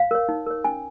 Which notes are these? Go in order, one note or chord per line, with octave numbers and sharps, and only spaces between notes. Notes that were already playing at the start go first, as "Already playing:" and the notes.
Already playing: F5
A#4 C#5
D#4
A#4 C#5
C#4 G#5